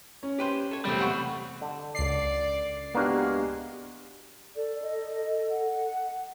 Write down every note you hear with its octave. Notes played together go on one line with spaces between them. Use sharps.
C#4
G4 B4 C5
A4 C#5
E2 C3 G3 A3 C4
F#5 B5 C#6
D3
C#2 D5 C7
G#3 A#3 B3 D4 F#4 G4
A4 D5
D#5
F#5